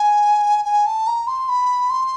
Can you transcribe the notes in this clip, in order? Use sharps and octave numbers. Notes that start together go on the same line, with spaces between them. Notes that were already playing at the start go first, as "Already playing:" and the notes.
Already playing: G#5
G#5
A5
A#5
C6
B5
C6